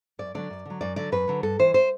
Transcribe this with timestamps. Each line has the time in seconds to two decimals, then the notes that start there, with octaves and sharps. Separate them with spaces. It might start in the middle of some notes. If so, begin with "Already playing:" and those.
0.19 F#2 D5
0.35 D3 F#3 D5
0.50 F#2
0.65 D3 F#3
0.81 F#2 D5
0.96 D3 F#3 D5
1.12 F#2 B4
1.28 D3 F#3
1.43 G2 A4
1.59 E3 C5
1.74 C5